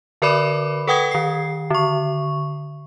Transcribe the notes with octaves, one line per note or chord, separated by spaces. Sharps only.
D3 A#4 B4 D5 B5 D6
A4 B4 F#5 G5 D#6 G#6
D#3 C7
D3 C#6